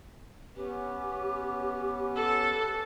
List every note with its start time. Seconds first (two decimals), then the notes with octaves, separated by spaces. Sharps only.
0.56 B3 C#4 G4 B4
2.16 A4